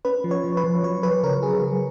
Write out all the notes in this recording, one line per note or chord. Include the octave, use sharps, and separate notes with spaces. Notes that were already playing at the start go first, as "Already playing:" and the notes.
C#4 B4
F3
C#5
F3
B4
F3
F#3 C#5
F#3 B4
C#3 A#4
F#3 G#4
F#3